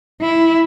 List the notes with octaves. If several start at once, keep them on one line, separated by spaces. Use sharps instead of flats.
E4